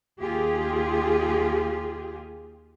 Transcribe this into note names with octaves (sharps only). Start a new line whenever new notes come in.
D#2 F4 G4 G#4